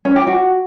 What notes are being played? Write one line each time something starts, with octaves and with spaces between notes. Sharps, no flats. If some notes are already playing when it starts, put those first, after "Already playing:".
C#4
G4
F#4